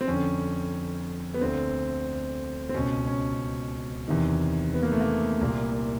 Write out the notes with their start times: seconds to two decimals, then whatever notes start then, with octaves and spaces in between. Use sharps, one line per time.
0.01 C4
0.08 F2 D3 C#4
1.34 B3
1.41 D2 D3 C4
2.69 C4
2.74 C#2 B2 C#4
3.07 C#4
4.08 E2 C3 D#3
4.74 B3
4.83 A#3
4.92 A3
5.00 A#3
5.41 C2 A#2 A#3